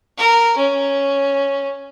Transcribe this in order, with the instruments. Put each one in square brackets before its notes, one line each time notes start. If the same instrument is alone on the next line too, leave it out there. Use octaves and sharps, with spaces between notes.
[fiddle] A#4
C#4